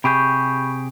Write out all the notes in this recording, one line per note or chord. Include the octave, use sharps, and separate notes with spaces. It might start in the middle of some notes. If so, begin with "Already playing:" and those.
C3 G4 G#4 B5 C#6 G6